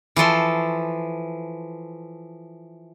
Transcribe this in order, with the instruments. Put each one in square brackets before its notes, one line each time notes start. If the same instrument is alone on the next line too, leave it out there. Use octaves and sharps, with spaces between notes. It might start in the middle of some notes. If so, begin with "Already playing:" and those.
[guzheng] E3 F3 A4 C6